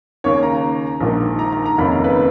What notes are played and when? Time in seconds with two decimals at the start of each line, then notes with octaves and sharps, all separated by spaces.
0.24 D#2 C#3 C#5
0.43 A#5
1.00 A#1 G#2 D#3
1.39 A#5
1.52 A#5
1.66 A#5
1.78 F1 D#2 C#3 B5
1.92 A#5
2.04 B4